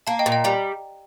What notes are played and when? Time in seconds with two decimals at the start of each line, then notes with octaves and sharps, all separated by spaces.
0.07 A#3 F5 A5
0.19 D#5 G5
0.26 A#2
0.32 D#5 G5
0.44 G3 G5 A#5